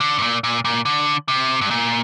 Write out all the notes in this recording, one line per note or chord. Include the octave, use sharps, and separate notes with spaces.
D3
G2
A#2
A#2
A#2
D3
C3
G2
A#2